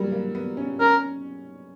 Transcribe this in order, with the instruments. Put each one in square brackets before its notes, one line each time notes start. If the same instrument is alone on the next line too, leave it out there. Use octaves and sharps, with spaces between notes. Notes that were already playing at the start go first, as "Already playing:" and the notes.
Already playing: [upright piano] F#3 G3 A#3
A#3
B3
C#4
[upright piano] C#4 [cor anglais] A#4